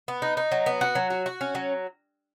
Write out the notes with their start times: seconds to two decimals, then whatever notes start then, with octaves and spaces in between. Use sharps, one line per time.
0.08 B3
0.22 D#4
0.37 D#4
0.52 F#3
0.66 B3
0.81 F#4
0.95 F#3
1.10 F#4
1.26 F#4
1.41 C#4
1.55 F#3